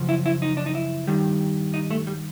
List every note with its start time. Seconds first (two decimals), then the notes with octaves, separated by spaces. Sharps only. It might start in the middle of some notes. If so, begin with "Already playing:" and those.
Already playing: F#2 C#3 F3
0.09 E4
0.26 E4
0.42 D#4
0.57 D4
0.66 D#4
0.75 E4
1.07 G2 D#3 G3
1.74 D#4
1.91 A3
2.07 G3